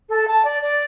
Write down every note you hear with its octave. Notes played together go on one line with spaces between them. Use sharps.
A4
A5
D5
D5